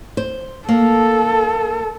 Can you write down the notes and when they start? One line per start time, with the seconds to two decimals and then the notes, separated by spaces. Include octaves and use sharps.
0.17 C5
0.69 A#3 A4